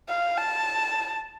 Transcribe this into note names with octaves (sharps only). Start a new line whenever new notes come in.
F5
A5